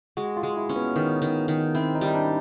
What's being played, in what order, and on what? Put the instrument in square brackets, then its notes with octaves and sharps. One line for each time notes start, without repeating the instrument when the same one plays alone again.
[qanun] G#3 [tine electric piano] F#4
[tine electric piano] F4
[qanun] G#3
[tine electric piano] E4
[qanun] C#4
[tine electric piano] B3
[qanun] D#3 [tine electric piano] B3
[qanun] D#3
D#3
[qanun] C4 [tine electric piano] E4
[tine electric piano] D#4
[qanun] G3
[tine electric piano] D#4
D4